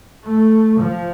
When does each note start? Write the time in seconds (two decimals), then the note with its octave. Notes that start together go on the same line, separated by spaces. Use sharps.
0.25 A3
0.79 F3